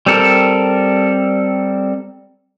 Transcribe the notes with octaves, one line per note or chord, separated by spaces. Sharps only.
G3 C4 A4 A#4